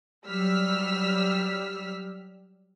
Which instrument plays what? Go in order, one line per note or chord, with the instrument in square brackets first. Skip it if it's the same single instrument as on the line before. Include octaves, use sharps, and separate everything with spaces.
[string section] F#3 G3 E6 F6 B6